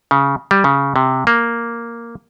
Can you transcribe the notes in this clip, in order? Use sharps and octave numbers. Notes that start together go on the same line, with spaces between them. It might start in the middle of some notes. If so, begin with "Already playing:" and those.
C#3
G3
C#3
C3
A#3